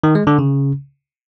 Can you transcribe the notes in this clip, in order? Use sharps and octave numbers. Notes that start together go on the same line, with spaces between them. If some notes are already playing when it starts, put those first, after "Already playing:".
D#3
G#3
D3
C#3